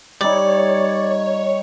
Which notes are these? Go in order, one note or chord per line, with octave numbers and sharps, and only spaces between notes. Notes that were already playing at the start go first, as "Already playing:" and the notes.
G3 D#4 C#5 D5